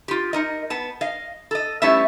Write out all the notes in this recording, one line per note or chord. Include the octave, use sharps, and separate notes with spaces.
F4 G4
D#4 A#4 D#5
B3 A5
D#5 F5
A4 D#5
G3 A3 B3 C#4 E4 E5